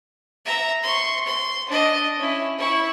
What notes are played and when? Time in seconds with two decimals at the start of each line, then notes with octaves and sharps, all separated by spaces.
0.46 E5 A#5
0.83 C6 C#6
1.26 C6
1.68 D4 D#5
2.18 C#4 E4
2.58 E4 C#6